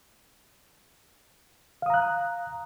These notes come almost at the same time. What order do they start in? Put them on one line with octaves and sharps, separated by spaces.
F5 D#6 A#5 F#6